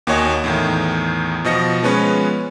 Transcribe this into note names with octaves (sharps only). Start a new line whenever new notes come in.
D#2 A#3 F#4 C#5 D#5 G#5
E2 A2 D#3
B2 F3 D#5 A#6 C#7
F3 G#3 B3 C#4 B4 C#5